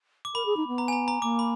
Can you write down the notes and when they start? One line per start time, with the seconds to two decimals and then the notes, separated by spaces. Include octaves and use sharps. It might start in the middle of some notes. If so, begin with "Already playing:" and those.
0.25 D6
0.35 A#4 B5
0.45 G#4
0.57 D#4
0.67 B3
0.78 A#5
0.88 G#5
0.93 A#5
1.08 A#5
1.22 A#3 D6
1.39 B5